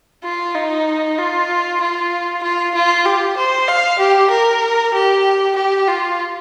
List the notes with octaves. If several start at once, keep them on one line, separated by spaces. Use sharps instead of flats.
F4
D#4
F4
F4
F4
F4
G4
C5
F5
G4
A#4
G4
G4
F4